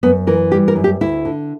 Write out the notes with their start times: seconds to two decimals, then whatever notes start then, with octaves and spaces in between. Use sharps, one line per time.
0.03 F#2 B3
0.27 E3 A#4
0.52 G3 G4
0.68 A#4
0.76 F#2
0.84 G4
1.01 D2 E4
1.25 D3